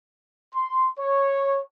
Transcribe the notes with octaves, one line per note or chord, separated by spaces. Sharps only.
C6
C#5